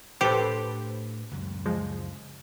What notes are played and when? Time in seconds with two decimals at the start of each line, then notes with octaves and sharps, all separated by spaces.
0.21 A2 D4 G4 A4 B4 C5
1.31 C#2 F#2
1.66 F3 G#3